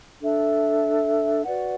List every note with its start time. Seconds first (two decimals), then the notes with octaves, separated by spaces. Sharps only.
0.20 D4 A4 E5
1.44 F#4 B4 D5 F#5